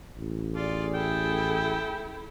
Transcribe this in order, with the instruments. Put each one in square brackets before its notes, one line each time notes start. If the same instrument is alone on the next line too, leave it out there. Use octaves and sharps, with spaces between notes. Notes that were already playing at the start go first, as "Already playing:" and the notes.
[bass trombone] A1
[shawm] F4 [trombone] G#4 [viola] D5
[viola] E4 A4 [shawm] G5